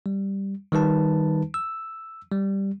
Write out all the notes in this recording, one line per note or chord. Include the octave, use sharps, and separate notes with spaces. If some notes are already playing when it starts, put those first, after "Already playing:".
G3
D#3 G3 D#4 B4 A5
E6
G3